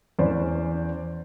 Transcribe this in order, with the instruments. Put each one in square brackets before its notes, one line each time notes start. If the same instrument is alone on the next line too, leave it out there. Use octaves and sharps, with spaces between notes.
[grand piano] E2 C#4 B4 C5 D5